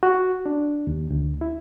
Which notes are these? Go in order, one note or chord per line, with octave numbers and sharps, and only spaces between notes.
F#4
D4
D#2
D2
E4